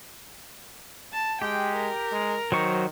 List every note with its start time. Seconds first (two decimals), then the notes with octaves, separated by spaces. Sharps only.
1.13 A5
1.42 G#3 G4 G5
1.76 A#4
2.12 G#3
2.52 D#3 F#3 C5 C#6